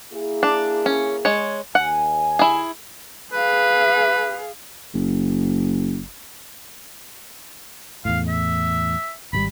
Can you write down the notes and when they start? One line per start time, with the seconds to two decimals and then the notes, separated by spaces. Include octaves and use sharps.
0.13 A#3 E4 G#4
0.43 D4
0.86 C#4
1.25 G#3 C#5
1.75 D#2 F#5 G#5
2.39 E4 G#4
3.33 G#4 B4 F5
4.94 F#1
8.05 E2 A2 F5
8.28 E5
9.33 G#1 D3 G3 B5